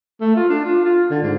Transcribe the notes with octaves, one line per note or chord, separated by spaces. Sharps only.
A3
F4
D4
F4
F4
D3
G#2